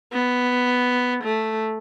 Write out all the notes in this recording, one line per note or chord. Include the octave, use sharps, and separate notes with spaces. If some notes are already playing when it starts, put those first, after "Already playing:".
B3
A3